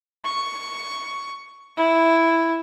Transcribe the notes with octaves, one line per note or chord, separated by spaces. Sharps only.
C#6
E4